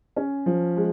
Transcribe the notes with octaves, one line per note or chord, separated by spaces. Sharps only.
C#4
F3
G#3